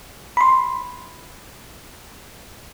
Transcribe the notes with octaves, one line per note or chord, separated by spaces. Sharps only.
B5 C6